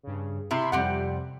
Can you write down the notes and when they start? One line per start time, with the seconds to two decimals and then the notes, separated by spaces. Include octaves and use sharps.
0.03 G2 C#3
0.51 C3 E4 B5 C6
0.72 F2 C3 G3 C4 G4 F#5